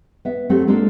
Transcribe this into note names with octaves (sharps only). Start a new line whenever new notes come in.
B3 E5
F#3 A3 C4 F#4 G4 A4
G#3 A#3 C4 D4 F4 A4